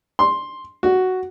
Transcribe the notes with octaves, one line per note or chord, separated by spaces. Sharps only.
C6
F#4